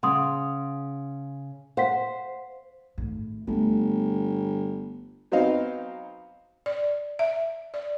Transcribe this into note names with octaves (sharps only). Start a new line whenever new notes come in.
C#3 F#5 C6 D#6
C5 F5 F#5 B6
G#1 A2
G1 A3 B3
F#3 B3 C4 D#4 D#5 F5
D5
E5
D5